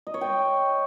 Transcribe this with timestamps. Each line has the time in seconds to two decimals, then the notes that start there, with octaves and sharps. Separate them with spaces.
0.07 D#5
0.14 C#5
0.21 G5